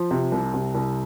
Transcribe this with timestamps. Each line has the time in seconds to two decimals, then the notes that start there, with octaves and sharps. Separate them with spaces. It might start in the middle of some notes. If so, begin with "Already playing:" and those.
Already playing: F3
0.11 C3
0.32 C2
0.54 C3
0.75 C2